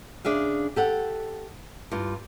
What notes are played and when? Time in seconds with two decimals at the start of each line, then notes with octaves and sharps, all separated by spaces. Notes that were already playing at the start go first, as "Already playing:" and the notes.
0.25 C#3 D4 G#4 E5 F5
0.76 G4 A4 F#5
1.91 G2 F4